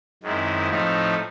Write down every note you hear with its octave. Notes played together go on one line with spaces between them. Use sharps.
F#2 D#3 G#3 C4 E4
A2 F3 A3 C4 D#4